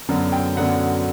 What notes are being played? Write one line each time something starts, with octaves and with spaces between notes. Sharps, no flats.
F#2 D3 F#3 B3
G5
F#2 D3 F#3 B3 F#5